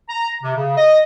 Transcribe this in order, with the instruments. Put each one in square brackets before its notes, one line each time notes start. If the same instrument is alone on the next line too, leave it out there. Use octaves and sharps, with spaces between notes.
[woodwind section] A#5
C3
C#3
D#5